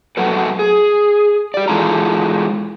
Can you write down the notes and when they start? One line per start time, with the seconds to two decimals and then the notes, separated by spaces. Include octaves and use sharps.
0.17 F#3 A3 F#4 A4 B4
0.59 G#4
1.54 G4 D5
1.68 E3 G#3 F4 A4 A#5